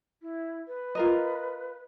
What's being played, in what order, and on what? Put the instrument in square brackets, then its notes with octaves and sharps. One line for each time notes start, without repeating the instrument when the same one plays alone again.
[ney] E4
B4
[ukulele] F4 A#4 D#5